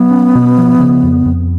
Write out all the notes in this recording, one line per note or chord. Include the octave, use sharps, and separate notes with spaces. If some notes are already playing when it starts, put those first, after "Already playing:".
Already playing: F#3 B3
C#4
B2
F3
C#3
F2
F2